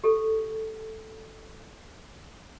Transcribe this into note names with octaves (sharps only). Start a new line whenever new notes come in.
G4 A4